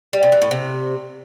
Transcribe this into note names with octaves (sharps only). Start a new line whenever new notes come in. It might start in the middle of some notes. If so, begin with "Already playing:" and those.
G3
C3
E3
A2
C3